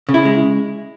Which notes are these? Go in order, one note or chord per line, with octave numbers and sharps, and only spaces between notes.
C#3
E4
G#3